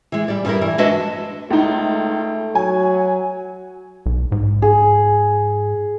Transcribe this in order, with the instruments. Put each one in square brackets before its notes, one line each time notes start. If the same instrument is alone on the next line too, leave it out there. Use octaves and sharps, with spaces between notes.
[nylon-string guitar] E3 G#3
G3 D5
G2 G3 E4 A#4
E3
G#3 D4 F#4 B4 D#5 E5
[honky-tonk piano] C#2 D#4 [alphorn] A3
[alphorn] F#3 [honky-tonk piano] G#5
[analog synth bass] B1
G#2
[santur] G#4